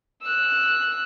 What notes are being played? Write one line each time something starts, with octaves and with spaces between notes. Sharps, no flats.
E6 F#6